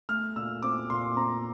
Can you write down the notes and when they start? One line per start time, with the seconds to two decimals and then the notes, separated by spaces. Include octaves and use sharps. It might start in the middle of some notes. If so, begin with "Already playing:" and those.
0.09 A3 F6
0.36 A#2 E6
0.62 C4 D6
0.90 A#2 C6
1.16 C4 A#5